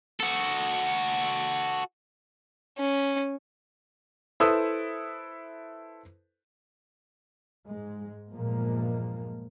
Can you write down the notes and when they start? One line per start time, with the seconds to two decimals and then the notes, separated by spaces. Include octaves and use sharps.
0.20 F#4 A4
2.78 C#4
4.40 E4 A4 B4 C5 D#6 E6
7.68 G#2 G#3
8.33 E2 G2 A#2 F3 G#3 A#3